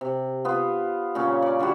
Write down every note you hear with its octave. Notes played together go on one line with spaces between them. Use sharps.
C3
B3 F4
A#2 C#3 C#4
D5
D3 G3 E4 F#4